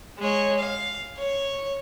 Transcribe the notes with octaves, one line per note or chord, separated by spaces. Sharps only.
G#3 C#5
F5
C#5